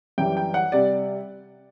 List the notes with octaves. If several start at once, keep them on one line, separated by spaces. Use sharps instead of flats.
F#2 E3 G3 G5
G5
F#5
C3 G3 D5